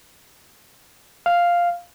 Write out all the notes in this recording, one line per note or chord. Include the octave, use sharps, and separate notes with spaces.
F5